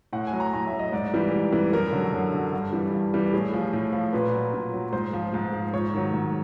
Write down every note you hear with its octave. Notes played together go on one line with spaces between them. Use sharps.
A2 F#5
G#5
F#3
A#5
A2 A#5
E5
F#3
D#5
G#2 D5
E3 G3
G#2
E3 G3
F#2 A#4
D3 F#3
F#2
D3 F#3
G2
E3 G3
G2
E3 G3
A2 G#4
F3
A2
F3
A#2 B4
F#3
A#2
F#3
G#2 C5
F3
G#2
F3
G#2 C#5
D#3 F#3
G#2